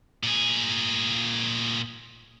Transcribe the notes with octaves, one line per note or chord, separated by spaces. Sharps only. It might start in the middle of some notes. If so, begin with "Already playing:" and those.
A#2 G#4